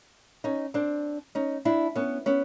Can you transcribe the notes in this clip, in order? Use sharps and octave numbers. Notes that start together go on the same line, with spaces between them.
C#4 D#4
C4 D4
C#4 D#4
D4 E4
B3 C#4
B3 C#4